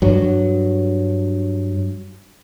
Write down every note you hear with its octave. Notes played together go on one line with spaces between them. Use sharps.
G2 F#3